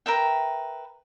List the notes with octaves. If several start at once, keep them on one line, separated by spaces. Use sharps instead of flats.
A#4 B4 E5 G5